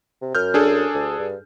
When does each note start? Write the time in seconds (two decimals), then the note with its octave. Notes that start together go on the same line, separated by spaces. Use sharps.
0.22 C3
0.35 F#2 F6 G6
0.54 D4 G#4 A4
0.94 D2
1.20 G2